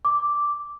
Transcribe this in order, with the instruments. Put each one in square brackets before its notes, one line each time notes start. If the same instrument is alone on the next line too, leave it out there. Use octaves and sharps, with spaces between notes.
[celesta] D6